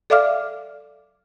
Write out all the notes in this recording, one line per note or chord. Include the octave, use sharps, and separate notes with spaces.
A4 D5 E5 F5 D6 F6